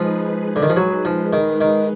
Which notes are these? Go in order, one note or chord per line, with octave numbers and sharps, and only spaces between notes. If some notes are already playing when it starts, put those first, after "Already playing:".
Already playing: F3 G#3 D#4 G#4 B4
D3
D#3
F3
F#3
F3
D#3
D#3